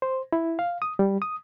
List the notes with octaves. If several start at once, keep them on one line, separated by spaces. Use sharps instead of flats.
C5
E4
F5
D#6
G3
D#6